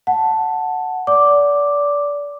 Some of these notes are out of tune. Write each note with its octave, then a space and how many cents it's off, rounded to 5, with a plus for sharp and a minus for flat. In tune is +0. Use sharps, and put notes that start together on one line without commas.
F#5 +0 A5 +0
D5 -25 D6 +0